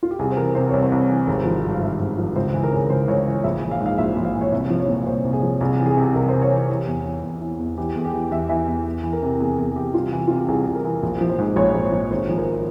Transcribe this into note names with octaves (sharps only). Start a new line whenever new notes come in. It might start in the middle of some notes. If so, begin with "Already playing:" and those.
F4
G4
C2 G#4
C5
E3 A#4
C3 C5
C2 C#5
C5
C2
E3
G#1
F3
G2
F5
G#1 E5
G#1
F3
C#2 C5
E3
A#4
C#3
C#2 C5
C#2 C#5
E3
A#1 E5
E3
F5
G#2
F5
A#1 E5
A#1
F5
E3
C#5
C2 E5
F3
C#5
A#2
C2 C5
C2
G#4
F3
C2 G#4
G4
E3
G#4
C3
C2 A#4
C2 C5
C#5
E3
E3
E2
E3
E2
E3
E2
E3 G4
E2 G#4
G4
E3
E2 E5
E3 E5
E2
E2
E3
A#4
C3
E2 G#4
E2 G#4
G#4
E3 G4
C2 F4
E3
C3 F4
G4
C2 G#4
C2 G#4
A#4
E3
A#1
F3
C5
G#2
A#1 C#5
A#1
C5
F3
G#1 C5
F3 G#4
A#4